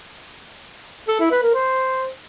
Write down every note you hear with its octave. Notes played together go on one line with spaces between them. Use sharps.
A4
E4
B4
A#4
C5